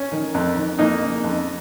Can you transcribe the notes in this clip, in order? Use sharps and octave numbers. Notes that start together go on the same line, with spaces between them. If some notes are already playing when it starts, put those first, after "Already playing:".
Already playing: C#4
D#3
F2
D#3
F2 A#3 D#4
C#3
F2